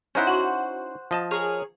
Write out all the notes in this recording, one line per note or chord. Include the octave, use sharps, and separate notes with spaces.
C#4 D#4 E4 C5 F#5
F#4
F3 D#5 A5
G#4 A#4 C#5